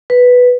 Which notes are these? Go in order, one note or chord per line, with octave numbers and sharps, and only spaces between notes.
B4